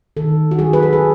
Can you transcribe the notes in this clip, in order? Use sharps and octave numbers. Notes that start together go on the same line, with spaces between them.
D#3 A4
F#4
F#3 G#4
B4
A4
G#4